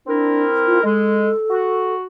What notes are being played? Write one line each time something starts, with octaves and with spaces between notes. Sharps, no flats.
C4 D4 E4 A#4
F4
G#3 A4
F#4